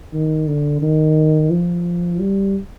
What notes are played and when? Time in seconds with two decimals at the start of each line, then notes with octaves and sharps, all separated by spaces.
0.13 D#3
0.47 D3
0.82 D#3
1.50 F3
2.20 G3